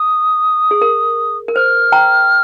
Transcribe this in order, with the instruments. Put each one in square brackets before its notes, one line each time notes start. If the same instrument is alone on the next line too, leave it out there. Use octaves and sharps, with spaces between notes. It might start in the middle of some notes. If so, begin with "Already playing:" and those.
Already playing: [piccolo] D#6
[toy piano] G#4
A#4
A#4
[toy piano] C5 [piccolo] F6
[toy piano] G5 A#5